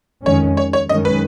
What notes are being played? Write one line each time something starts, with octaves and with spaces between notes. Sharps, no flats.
F2 D#3 G#3 C#4 C#5
C#5
C#5
F#2 D#3 G#3 C#4 D#5
B4